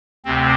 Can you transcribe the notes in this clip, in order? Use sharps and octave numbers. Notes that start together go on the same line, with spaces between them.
D2 C3 C4